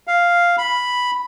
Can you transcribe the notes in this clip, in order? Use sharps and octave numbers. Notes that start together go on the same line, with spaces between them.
F5
B5